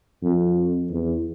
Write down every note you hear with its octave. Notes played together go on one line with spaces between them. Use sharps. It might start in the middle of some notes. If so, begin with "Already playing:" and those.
F2
E2